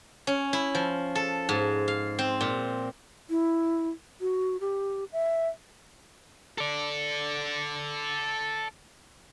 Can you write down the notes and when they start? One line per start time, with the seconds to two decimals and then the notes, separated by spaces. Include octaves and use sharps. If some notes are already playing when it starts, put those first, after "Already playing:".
0.27 C#4
0.53 E4
0.75 F3
1.15 A4
1.49 G#2
1.88 F5
2.19 C4
2.41 A#2
3.30 E4
4.21 F#4
4.61 G4
5.12 E5
6.58 A4 D5